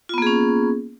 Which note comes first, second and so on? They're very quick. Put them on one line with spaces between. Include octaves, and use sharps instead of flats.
F4 B3 A#3 G#4 C#4